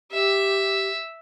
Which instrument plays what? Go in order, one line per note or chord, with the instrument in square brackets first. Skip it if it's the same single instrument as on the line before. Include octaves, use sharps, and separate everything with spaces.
[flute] G4 [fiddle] E5